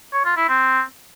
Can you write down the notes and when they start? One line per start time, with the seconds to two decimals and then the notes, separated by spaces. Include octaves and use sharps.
0.13 C#5
0.25 F4
0.37 E4
0.49 C4